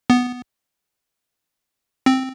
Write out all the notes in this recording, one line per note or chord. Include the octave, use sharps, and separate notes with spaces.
B3
C4